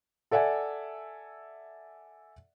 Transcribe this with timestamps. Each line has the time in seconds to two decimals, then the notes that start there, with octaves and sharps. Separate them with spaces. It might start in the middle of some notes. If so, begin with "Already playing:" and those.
0.31 A4 D5 E5 F#5 G#5